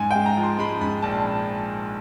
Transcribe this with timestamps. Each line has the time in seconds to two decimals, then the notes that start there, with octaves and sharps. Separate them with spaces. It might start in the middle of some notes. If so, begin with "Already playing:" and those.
Already playing: G#2 G#5
0.11 G#3 G5
0.26 A#5
0.37 F3
0.43 C6
0.59 G#3 B5
0.81 G#2 B5
1.02 A#1 A5
1.24 F3